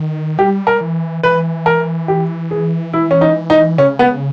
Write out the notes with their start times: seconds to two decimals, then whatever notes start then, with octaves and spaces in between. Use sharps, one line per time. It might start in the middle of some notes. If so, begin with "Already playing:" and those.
Already playing: D#3
0.38 G3 G4
0.67 A#4
0.81 E3
1.23 E3 B4
1.66 A#4
2.08 G4
2.51 G#4
2.93 E4
3.11 C#4
3.21 D#4
3.50 D#4
3.78 C#3 C#4
3.99 B3